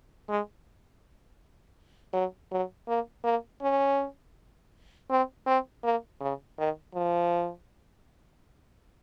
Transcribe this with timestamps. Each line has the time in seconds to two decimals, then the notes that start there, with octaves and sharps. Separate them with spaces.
0.29 G#3
2.13 F#3
2.51 F#3
2.88 A#3
3.24 A#3
3.62 C#4
5.10 C4
5.46 C4
5.84 A#3
6.20 C#3
6.58 D#3
6.95 F3